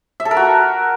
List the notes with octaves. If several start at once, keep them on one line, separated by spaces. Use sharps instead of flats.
E5
A4
A#4
F#4